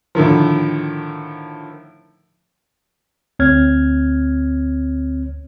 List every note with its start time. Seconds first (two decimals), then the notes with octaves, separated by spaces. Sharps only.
0.15 A2 D3 D#3 F3
3.39 D2 C4 C#5 F6 G#6